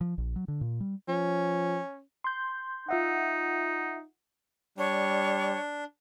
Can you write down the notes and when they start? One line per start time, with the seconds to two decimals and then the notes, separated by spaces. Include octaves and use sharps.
0.01 F3
0.18 A#1
0.36 F#3
0.48 D3
0.61 A#2
0.80 G3
1.08 F3 C#4
2.24 C6 G6
2.89 D#4 F4 E5 F#5
4.78 G3 D4 C#5